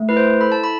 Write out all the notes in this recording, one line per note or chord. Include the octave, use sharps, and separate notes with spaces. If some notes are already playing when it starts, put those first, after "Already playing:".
Already playing: A3
E4 B4
C5
A4 B5
A5
B5